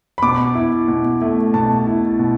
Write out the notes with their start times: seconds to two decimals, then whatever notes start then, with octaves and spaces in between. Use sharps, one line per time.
0.18 B5
0.22 B2 D6
0.55 E4
0.88 B2
1.22 A3
1.54 B2 A5
1.87 E4
2.19 B2